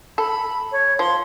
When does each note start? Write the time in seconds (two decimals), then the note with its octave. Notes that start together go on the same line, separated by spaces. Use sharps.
0.18 A4 B5
0.72 C#5
0.99 F3 C6